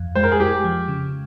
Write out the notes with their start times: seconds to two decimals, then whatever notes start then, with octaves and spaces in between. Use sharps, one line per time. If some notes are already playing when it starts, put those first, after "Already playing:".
Already playing: F2
0.15 G#3 C5
0.23 A#4
0.32 G#4
0.40 G#3 G4
0.64 F3
0.88 C#3